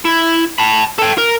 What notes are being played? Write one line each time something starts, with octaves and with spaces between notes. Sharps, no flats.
E4
A5 B5
A4 G5
A#4